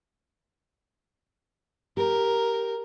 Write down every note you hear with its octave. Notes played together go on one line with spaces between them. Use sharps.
G4 A#4